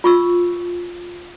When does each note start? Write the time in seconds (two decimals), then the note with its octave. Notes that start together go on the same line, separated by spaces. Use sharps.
0.04 F4 C#6 E6